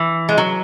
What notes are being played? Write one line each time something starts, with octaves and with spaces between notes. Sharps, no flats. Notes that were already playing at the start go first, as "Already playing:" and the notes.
Already playing: E3
G#3
F#3